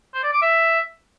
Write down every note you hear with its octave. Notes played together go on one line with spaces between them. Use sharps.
C5
D5
D6
E5